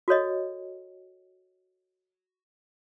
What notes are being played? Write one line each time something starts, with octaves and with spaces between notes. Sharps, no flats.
F#4 A4 C#5 D#5